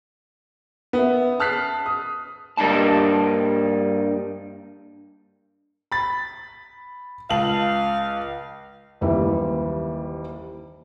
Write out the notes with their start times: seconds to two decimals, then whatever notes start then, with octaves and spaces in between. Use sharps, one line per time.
0.93 B3 E5
1.40 A5 F6 F#6 B6 C7
1.86 D#6
2.57 G2 G3 A#3 D4 D#4 A5
5.92 B5 A6
7.30 C#2 F5 A5 F#7
9.01 F#1 D#2 E3 G3 E5